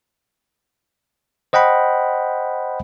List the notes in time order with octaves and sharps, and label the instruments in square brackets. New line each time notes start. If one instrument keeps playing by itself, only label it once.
[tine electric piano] C5 D#5 F#5 G5 B5